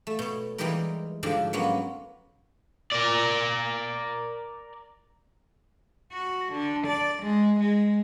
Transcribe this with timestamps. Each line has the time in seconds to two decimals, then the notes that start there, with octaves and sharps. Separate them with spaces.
0.07 A3
0.19 B2 C#5
0.58 E3 G3 G#3 D#4 G4 A#4
1.23 G#2 D3 F3 D4 G4 G#4
1.53 F#3 G#3 A#3 B3 C#4
2.92 A#4 D5
6.13 F#4
6.53 D3
6.88 D5
7.23 G#3
7.60 G#3